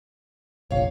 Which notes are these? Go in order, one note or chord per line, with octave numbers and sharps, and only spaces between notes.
F1 A#1 C#5 F5